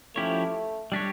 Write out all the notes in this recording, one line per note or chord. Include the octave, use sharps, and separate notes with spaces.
F3 A3 C#4 E4 G4 C#5
G3 D4 G4 C#5